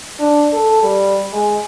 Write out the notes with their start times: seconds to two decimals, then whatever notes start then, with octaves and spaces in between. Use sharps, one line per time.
0.20 D4
0.53 A4
0.83 G3
1.33 G#3